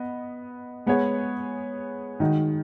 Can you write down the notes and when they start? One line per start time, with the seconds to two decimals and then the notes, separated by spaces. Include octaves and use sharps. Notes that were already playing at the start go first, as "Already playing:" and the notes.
Already playing: B3 D#5
0.86 G#3 B3 G#4 C#5
2.20 D#3 G#3 D#4 F#4 D#5